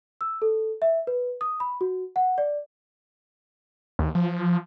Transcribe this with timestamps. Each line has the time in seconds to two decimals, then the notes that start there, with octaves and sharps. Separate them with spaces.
0.21 E6
0.42 A4
0.82 E5
1.07 B4
1.41 D#6
1.60 B5
1.81 F#4
2.16 F#5
2.38 D5
3.99 D#2
4.15 F3